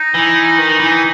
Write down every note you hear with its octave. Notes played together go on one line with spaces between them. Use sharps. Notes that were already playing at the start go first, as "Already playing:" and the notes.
Already playing: D#4
E3
D#3
E3